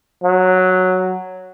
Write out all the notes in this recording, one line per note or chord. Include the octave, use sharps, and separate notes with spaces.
F#3